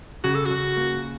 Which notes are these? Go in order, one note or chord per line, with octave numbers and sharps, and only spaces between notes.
C#3 F#4
A4
F#4
C#3
A#3